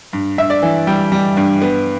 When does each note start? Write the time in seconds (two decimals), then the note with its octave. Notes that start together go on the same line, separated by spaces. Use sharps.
0.13 G2
0.38 G2 E5
0.50 D5
0.62 E3
0.87 G3 G5
1.12 G3
1.37 G2
1.62 B3